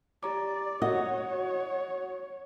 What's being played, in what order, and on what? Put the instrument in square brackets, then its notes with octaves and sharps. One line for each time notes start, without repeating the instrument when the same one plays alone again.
[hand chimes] G4 A#5 D6 [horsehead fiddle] D5
[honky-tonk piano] F#4 [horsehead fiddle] C#5 [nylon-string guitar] D#5 [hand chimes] D#6